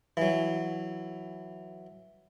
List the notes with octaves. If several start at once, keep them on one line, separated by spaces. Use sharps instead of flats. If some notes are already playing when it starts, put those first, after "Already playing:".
E3 F#3